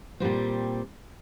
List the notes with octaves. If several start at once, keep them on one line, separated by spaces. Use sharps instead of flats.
A#2 G3 C4